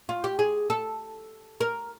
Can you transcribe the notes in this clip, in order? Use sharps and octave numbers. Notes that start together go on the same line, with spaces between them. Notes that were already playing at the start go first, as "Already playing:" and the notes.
F4
G4
G#4
A4
A#4